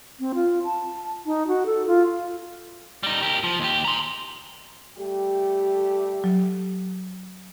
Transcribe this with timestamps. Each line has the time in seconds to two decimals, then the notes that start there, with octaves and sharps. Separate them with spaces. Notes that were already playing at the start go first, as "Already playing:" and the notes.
0.20 C4
0.35 F4
0.65 A5
1.26 D#4
1.47 F#4
1.66 A4
1.87 F4
3.03 G3 D#4
3.22 G4 A#4
3.43 F3
3.60 D#2 G4
3.85 A#5 C6
4.97 G3 A3 G4
6.24 F#3